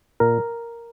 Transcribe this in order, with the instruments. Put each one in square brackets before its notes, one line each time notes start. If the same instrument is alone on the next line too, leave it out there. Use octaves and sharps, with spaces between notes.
[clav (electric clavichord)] A#2 A#4